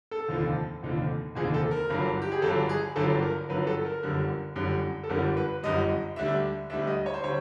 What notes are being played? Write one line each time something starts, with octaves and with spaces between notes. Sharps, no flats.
A4
F1 D#2 D3 F3
F1 D#2 D3 F3
F1 D#2 D3 F3 G#4
A4
A#4
G1 G2 D3 F#3
G4
G#4
G1 G2 D3 F#3 A4
G#4
G1 G2 D3 F#3 A4
A#4
G1 G2 D3 F#3 B4
A4
A#4
G1 F#2 D3 G3
G1 F#2 D3 G3
A4
G1 F#2 D3 G3 A#4
B4
G1 F#2 D3 G3 D#5
D2 D3 G3 E5
D2 D3 G3 E5
D#5
C#5
C5
D3 G3 C#5